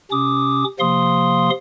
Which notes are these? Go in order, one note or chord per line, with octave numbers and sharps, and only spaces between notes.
C3 C#4 D6 D#6
C3 F3 A#3 F5 C6 D#6